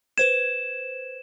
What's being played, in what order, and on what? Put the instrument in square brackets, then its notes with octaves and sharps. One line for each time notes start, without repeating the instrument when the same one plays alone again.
[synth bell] B4 C5 G#6 [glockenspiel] E7